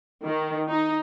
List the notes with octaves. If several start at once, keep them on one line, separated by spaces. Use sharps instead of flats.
D#3
D#4